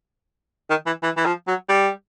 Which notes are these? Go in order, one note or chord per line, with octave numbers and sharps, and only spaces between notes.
D#3
E3
E3
E3
F3
F#3
G3